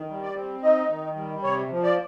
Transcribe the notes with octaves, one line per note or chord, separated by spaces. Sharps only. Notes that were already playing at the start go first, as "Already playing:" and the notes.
Already playing: D#3
G3
D5
C4
D#4 D#5
D#3
G3
C3 C#5
F3
D5